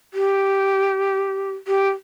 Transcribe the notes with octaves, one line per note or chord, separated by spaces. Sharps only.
G4
G4